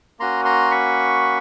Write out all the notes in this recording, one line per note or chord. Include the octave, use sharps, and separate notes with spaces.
A#3 C#4 F#4 A#5 C6
A#5 C6
B5 C#6